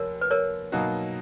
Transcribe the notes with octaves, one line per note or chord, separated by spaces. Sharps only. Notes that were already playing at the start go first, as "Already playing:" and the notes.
Already playing: F1 D#2 A#4 C#5
B4
A#4 C#5
B2 F#3 A#3 D#4 F#4